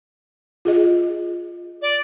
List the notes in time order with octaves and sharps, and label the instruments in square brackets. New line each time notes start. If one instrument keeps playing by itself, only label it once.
[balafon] F4 G#4 D#5
[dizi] D5